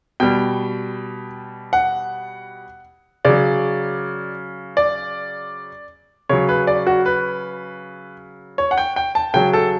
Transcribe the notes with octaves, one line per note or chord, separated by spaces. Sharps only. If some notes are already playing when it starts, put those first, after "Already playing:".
B2 G3 G5
F#5
C#3 F#3 D5
D5
C#3 F#3 C#5
B4
D5
F#4
B4
C#5
F#5
G5
G5
A5
C#3 F#3 G5
A4